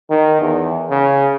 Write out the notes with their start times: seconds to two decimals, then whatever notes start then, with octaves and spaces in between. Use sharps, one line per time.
0.10 D#3
0.41 E2
0.90 C#3